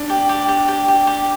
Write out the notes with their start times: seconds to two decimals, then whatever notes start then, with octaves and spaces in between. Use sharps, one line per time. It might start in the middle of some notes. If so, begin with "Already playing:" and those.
Already playing: D4
0.10 G4
0.29 G4
0.49 G4
0.68 G4
0.88 G4
1.07 G4